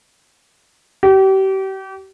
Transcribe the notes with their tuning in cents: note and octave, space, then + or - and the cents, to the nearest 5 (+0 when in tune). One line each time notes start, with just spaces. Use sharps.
G4 -35